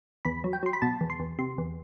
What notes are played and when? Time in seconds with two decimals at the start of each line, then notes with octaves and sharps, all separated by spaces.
0.25 E2 B5
0.44 F#3
0.53 G5
0.63 F#3 C6
0.73 B5
0.82 B2 A5
1.01 E2
1.10 C6
1.20 E2
1.39 C3 C6
1.58 E2